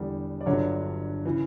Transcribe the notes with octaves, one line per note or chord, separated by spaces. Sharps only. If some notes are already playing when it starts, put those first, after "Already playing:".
Already playing: E1 E2 D3 G3
D5
G1 G2 D3 F#3 C#5
C#3 E3